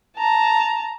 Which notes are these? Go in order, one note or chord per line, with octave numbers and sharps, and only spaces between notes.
A5 A#5